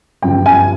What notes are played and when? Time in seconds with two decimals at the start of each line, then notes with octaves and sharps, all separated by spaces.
0.22 G1 F#2 C#3 F3 G5
0.46 G#5